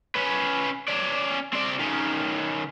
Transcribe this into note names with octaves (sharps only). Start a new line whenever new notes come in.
C#4 B4
C#4 D5
C4 D5
D#3 C#4